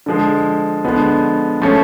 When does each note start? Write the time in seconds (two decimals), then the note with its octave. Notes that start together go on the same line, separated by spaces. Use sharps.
0.06 D3 F3 G#3
0.85 D3 F3 G#3 B3
1.62 F3 A3 C#4